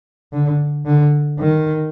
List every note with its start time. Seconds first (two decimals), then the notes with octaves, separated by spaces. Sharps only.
0.33 D3
0.86 D3
1.39 D#3